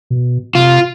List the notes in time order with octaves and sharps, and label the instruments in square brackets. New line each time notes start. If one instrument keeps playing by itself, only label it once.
[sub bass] B2
[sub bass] C3 [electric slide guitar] F4